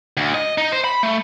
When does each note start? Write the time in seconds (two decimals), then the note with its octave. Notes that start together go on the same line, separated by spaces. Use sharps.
0.17 D2
0.34 D#5
0.58 D#4
0.72 C5
0.84 B5
1.03 A3